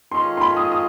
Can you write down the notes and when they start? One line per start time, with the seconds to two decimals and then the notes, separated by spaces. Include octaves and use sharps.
0.12 D#3 G#3 C#4 F4 A4 C6
0.37 C6
0.41 B5
0.57 D#6
0.72 D#6